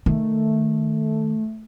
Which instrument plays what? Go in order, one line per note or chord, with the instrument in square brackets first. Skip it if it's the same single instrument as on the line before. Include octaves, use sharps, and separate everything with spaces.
[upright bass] D#3 [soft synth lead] A3